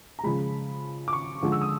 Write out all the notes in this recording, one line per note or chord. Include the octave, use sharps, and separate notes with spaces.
A#5
C#3 F3 G#3 B5
D6
C#6
D3 F3 G#3
E6
D#6